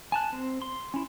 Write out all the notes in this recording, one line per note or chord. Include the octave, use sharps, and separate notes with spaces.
G#5 A5 F#6
C4
C6
C#4 E4